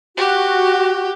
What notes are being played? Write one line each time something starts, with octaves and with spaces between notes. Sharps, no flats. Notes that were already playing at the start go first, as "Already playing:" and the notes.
F#4 G4